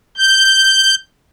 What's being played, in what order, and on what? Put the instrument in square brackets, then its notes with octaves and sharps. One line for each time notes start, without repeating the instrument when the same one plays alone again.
[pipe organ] G6